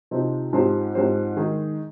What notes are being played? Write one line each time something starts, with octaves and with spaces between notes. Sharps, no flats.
C3 F3 C4 D#4
G#2 F3 C4 G4 C5
G#2 F3 C4 G4 C5
D#3 G#3 D#4 G#4